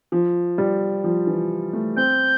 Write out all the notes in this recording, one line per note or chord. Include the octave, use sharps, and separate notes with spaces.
F3
G3
F3
E3
A3
C4 G6